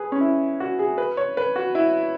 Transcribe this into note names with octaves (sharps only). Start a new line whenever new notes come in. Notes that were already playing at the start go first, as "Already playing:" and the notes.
Already playing: G#4 B4
C#4
E4
F#4
G#4
B4
C#5
B4
F#4
E4